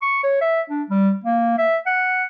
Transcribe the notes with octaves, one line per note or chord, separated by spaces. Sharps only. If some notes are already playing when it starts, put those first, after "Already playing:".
C#6
C#5
E5
D4
G3
A#3
E5
F#5